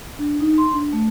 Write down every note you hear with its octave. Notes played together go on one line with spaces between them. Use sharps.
D4
D#4
C6
D4
A3